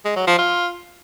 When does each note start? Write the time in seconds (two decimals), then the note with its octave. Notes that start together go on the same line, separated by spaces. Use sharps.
0.05 G#3
0.16 F#3
0.27 F3
0.38 F4